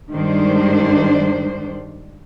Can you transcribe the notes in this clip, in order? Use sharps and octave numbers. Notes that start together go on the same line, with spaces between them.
G2 D#3 G#3 D4 C5